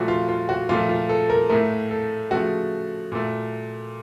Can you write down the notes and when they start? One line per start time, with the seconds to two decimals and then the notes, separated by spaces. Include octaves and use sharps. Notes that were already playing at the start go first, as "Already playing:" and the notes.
Already playing: A#2 F3 A3 F#4
0.08 F4
0.28 F4
0.49 F#4
0.69 A#2 F3 A3 F4
0.89 F4
1.09 A4
1.30 A#4
1.49 A2 A3 A#4
1.91 A4
2.31 C#3 F3 A3 F#4
3.12 A#2 A3